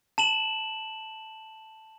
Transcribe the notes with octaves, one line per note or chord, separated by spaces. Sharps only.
A5 E7 F#7